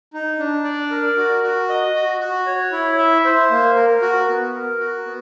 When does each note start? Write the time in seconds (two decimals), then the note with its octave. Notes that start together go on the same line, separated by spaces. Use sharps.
0.13 D#4
0.39 D4
0.64 D5
0.90 A#4
1.17 F#4
1.43 F#4
1.69 D#5
1.95 F#4
2.20 F#4
2.46 C#5
2.72 E4
2.98 E5
3.25 C5
3.50 A#3
3.76 A#4
4.02 F#4
4.28 B3
4.54 A#4
4.80 F#4
5.06 B3